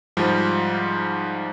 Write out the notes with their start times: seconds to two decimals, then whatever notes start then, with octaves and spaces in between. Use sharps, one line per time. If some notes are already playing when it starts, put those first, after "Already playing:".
0.17 G#2 F3 G3